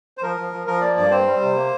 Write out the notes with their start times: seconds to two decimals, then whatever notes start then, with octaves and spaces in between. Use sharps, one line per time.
0.18 C5
0.22 F3 A#4
0.37 F3
0.52 F3
0.66 F3 A#4
0.81 A#3 D5
0.97 G2 D5
1.11 C4 C5
1.26 G3
1.41 C3
1.55 A#3